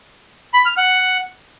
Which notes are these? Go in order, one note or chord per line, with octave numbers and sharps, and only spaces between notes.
B5
F6
F#5